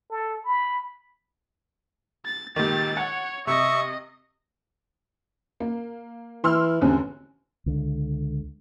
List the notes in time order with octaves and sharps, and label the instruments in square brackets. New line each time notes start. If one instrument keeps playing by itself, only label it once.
[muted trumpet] A4
B5
[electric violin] A6
[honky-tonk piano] C#2 A#2 D#3 [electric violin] G4 A6
[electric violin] C#5 [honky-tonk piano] F#5
[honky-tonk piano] C3 [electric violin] D#5 [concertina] E5 C#6
[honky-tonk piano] A#3
[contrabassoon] E3 [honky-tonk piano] C6 E6 F6
[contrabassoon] A1 [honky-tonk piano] E2 D3 C4
[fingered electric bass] C#2 D3